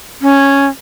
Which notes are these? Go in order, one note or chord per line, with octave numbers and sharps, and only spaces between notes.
C#4